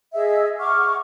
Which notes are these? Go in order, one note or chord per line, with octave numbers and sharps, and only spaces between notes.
G#4 D#5 E5 E6
F#5 C#6 D6 F6